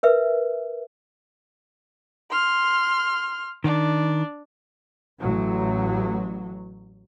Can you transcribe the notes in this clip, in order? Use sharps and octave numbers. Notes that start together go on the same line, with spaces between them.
A#4 B4 E5
C6 F6
D#3 D4
A1 F#3